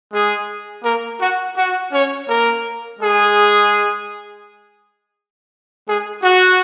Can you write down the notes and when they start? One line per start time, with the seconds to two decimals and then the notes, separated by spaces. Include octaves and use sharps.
0.11 G#3 G#4
0.83 A#3 A#4
1.19 F#4
1.56 F#4
1.91 C#4 C#5
2.27 A#3 A#4
2.99 G#3 G#4
5.86 G#3 G#4
6.22 F#4